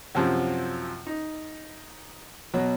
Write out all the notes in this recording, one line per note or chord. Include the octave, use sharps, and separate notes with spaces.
F#2 C3 F3
D#4
B2 F#3